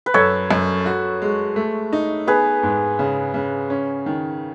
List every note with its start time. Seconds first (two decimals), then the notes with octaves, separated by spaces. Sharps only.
0.06 B4
0.14 F#2 A4 C#5
0.51 F#2
0.86 F#4
1.22 G#3
1.56 A3
1.93 D#4
2.27 B3 G#4 B4
2.63 G#2
2.99 C#3
3.34 C#3
3.70 C#4
4.06 D#3